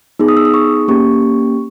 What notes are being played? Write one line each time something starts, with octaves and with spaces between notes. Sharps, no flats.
B3 D#4 G#4
D#6
E6
D#6
C#6
A#3 C#4 G4 C#6